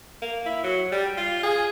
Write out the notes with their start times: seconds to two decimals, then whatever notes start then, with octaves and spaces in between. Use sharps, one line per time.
0.22 A#3
0.46 E4
0.64 F#3
0.92 G3
1.17 F4
1.43 G#4